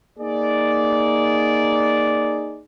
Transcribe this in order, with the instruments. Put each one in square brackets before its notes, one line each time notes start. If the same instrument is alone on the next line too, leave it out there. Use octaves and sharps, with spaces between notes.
[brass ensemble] A#3 D#4 G#4 D5